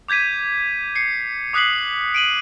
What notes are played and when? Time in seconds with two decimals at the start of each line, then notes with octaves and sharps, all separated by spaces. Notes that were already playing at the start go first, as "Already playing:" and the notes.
0.08 D6 G6 G#6 B6 D#7
0.96 C7 C#7
1.53 D6 D#6 F#6 B6 C7 F#7
2.14 D7 D#7 F#7